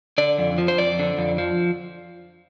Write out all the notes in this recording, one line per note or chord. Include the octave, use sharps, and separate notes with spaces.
D3 D5
F2
F3
C5
F2 D5
D3
F2
F3